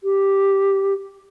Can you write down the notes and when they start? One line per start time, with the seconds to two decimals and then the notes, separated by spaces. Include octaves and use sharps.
0.04 G4